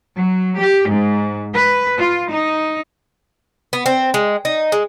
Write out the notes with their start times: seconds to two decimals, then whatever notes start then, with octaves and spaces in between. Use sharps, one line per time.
0.16 F#3
0.58 G4
0.89 G#2
1.52 B4
1.99 F4
2.30 D#4
3.73 B3
3.86 C4
4.14 G#3
4.45 D#4
4.72 G#3